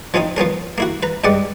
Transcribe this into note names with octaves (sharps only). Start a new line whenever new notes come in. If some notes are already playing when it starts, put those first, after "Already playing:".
F3 C4 C#4 D#4 F4
F3 B3 C#4 A#4
A#3 E4 F#4
B4 A#5
G2 G#3 G4 D5 F#5